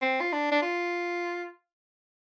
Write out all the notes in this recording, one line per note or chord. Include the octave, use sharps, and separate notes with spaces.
C4
F4
D4
D4
F4